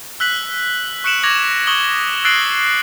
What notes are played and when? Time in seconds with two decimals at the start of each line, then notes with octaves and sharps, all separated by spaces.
0.20 E6 F#6 B6 F#7
1.04 C#6 F#6 C#7 D7 E7 F#7
1.23 C#6 D6 G#6 A#6 F7 F#7
1.67 C#6 D#6 F#7 G7
2.24 E6 F#6 A6 C7 D7 F#7